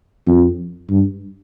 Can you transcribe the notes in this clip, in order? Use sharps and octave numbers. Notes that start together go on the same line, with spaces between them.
F2
G2